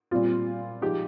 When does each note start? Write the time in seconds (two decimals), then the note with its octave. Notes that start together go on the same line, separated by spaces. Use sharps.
0.11 A#2 G3 C4 F4
0.81 F3 G#3 D#4 G4